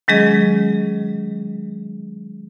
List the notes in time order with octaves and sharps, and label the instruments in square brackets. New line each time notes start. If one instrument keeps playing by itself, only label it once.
[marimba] D#3 F#3 G#3 C#4 G#4 D#5